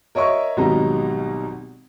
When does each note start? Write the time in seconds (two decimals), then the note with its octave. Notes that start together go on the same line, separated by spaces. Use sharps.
0.15 A#4 C#5 D#5 E5 C#6
0.57 G#1 B2 F#3 G3 D#4 A#5